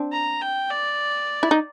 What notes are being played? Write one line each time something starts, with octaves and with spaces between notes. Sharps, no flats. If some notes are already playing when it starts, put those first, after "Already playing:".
Already playing: C4 D4
A#5
G5
D5
E4
D#4